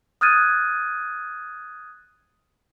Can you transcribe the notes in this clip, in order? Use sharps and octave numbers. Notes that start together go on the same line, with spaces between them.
D#6 F6 F#6 G#6 A6 D#7